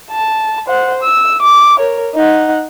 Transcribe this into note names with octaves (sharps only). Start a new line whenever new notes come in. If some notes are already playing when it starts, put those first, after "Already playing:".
A5
C5 F#5
E6
D6
A#4 C#5
D#4 F#5